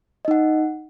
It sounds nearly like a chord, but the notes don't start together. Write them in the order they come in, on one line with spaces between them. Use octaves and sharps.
D#5 D#4 F#5